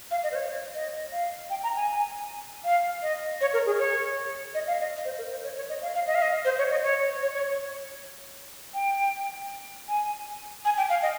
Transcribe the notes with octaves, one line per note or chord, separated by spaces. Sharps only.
F5
D#5
C5
C#5
D#5
F5
G5
A#5
G#5
F5
D#5
C#5
A#4
G#4
C#5
D#5
F5
D#5
C5
A#4
C5
C#5
C#5
D#5
F5
F5
D#5
F5
D#5
C5
C#5
D#5
C#5
C#5
C#5
G5
G#5
G#5
G5
F5
D#5